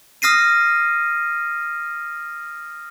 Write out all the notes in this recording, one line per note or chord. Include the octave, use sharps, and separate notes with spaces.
D#6 F6 A#6 C7 D#7